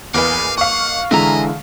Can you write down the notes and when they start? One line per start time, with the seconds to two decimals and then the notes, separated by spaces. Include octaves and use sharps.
0.14 E2 A#3 B4 D#5 F5 G#5
0.58 F5 F#5 C#6
1.11 D3 E3 G#3 D#5 E5 G#5 A#5